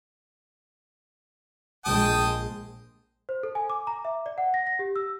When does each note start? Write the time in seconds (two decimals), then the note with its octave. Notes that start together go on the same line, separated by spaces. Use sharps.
1.85 A#1 G#3 G5 A5 D#6
3.29 C5
3.43 A4
3.55 G#5
3.70 D6
3.87 A#5
4.05 E5
4.26 D5
4.38 F#5
4.54 A#6
4.67 A#6
4.79 G4
4.96 E6